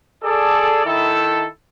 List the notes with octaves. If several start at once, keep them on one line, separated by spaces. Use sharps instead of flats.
G#4 A4 D5
D#3 E4 A4